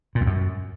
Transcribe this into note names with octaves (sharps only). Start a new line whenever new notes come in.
A#2
E2
F#2